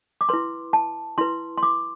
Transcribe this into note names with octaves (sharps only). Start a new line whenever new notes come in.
D6
E4 B4 C6
A5
E4 B4 C6
C6
D6